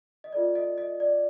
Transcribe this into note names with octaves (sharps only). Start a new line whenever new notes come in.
D#5
F4 A4 D5
D#5
D#5
D5